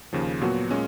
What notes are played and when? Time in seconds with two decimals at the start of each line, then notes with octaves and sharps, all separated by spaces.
0.13 D#2 C#3 F3
0.41 A#2 F#3 B3 F#4
0.71 A#2 G#3 C#4